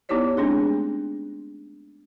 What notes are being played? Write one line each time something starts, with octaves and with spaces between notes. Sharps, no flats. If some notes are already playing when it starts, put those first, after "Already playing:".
B3 D#4 E4 G4 C#5 D5
G#3 A3 C4 D4 G#4